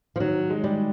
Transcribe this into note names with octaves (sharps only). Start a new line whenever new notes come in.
F3
D#3 F#3
G#3
G3